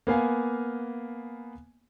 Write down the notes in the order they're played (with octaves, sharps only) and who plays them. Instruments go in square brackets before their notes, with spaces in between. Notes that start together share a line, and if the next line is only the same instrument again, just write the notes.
[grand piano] A#3 B3 F5 G#5